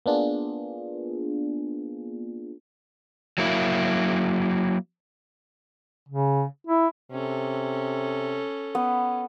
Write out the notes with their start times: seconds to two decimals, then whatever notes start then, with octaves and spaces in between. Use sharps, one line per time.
0.06 A#3 B3 D4 F4 G#4
3.38 F#3 A#3 E4
6.09 C#3
6.67 E4
7.12 C3 C#4 A4
8.75 B3